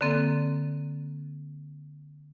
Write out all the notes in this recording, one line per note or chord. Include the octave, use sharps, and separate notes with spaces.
D3 A#3 C4 A4